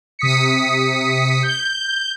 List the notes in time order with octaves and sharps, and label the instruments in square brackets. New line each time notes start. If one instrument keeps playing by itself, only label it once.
[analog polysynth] C3 D#6 B6 C#7
G6